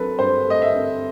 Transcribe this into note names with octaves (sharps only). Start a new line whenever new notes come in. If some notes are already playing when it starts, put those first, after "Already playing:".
Already playing: F#3 A3 C4 A4 B4
G2 C5
A3 D#5
E5
C4